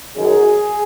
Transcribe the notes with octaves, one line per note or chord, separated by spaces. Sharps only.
F#2 D#3 F#3 G#4